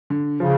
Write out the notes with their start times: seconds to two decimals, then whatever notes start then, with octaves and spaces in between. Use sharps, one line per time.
0.10 D3
0.40 C#3 F3